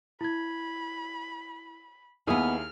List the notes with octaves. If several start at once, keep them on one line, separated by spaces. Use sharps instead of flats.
E4 B5 G#6
D#2 B3 E4 G#4 D#5 F6